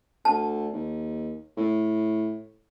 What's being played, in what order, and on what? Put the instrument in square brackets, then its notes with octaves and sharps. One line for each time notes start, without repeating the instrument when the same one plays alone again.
[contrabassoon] D2 [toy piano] A5
[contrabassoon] D#2
A2